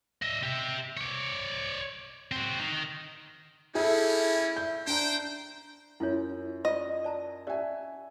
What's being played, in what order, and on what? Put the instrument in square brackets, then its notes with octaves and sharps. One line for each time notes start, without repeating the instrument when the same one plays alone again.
[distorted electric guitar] D#5 E5
G4 E5
C#5 D5
C4 F#4
D#3
[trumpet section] G3 A#3 C#4 [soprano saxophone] E4 [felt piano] G#4 A4
[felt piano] E5 G6
[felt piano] D4 A#5 [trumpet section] C5 G5
[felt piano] F#2 [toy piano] E4 F4 C#5
[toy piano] F4 D5 [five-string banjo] D#5
[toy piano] D5 A5 A#5
[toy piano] C#4 G4 D5 [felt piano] E5 G#5